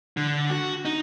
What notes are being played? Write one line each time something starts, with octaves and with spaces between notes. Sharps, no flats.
D3
F#4
D#4